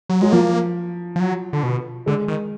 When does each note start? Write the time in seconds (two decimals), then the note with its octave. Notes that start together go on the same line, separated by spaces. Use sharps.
0.09 F#3
0.22 F#3 G#3
0.32 F3 A#3
1.16 F3
1.20 F#3
1.53 D3
1.63 B2
2.06 D3 G#3
2.28 D#3